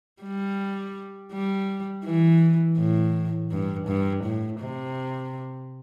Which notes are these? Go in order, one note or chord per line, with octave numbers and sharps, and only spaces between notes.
G3
G3
E3
A2
G2
G2
A2
C3